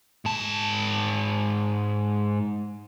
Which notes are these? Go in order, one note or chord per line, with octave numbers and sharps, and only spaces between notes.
G#2 A5